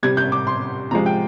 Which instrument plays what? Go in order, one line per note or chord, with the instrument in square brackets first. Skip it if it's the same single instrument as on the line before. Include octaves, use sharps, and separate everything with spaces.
[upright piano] C3 G3 G#6
G6
D6
C6
C3 F3 G#3 A#5
G5